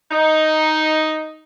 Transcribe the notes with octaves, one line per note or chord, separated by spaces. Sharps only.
D#4